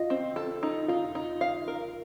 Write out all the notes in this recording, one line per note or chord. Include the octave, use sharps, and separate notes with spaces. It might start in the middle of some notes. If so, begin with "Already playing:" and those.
Already playing: F4 D#5
C4
A4
D#4
D#4 F4
D#4
F5
A#4